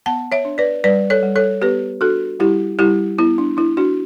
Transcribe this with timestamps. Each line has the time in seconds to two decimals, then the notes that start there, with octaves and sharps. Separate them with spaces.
0.06 B3 F#5 A5
0.32 C#5 E5
0.45 D4
0.58 B4 D5
0.84 G3 B4 D5
1.10 A4 C#5
1.23 G3
1.36 A4 C#5
1.62 B3 G4 B4
2.01 D4 F#4 A4
2.40 G3 E4 G4
2.79 G3 E4 G4
3.18 B3 E4
3.38 D4
3.57 D4 E4
3.77 D4 F#4